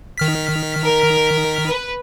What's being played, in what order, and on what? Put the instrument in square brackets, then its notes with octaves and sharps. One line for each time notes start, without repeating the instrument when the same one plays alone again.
[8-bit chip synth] D#3 F6 B6
[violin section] A#4
B4